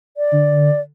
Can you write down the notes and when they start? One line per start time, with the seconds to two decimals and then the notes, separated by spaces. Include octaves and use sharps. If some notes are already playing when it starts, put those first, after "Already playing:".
0.17 D5
0.32 D3